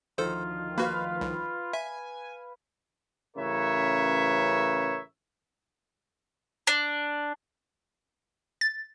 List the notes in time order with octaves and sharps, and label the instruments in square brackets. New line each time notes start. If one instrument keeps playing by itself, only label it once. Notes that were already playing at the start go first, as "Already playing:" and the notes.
[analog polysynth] D2 D#3 F3 [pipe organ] F4 [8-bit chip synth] A4 C5
[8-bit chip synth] A#3 F#4 [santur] B4 F5
[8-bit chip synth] C2
[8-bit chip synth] E5 [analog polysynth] G#5
[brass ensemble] A1 C#3 A#4 B4 C#5 E5
[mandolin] D4
[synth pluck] A6